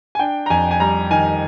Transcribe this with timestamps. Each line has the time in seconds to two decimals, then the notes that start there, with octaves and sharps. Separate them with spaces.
0.15 G#5
0.19 D4 G5
0.46 A#5
0.50 F2 G#5
0.71 G#5
0.80 G3 A#5
1.11 D#3 G#5